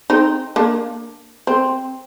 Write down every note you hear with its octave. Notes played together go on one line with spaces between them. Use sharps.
C4 D#4
A#3 D4
C4